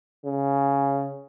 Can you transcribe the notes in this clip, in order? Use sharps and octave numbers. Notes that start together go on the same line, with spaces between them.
C#3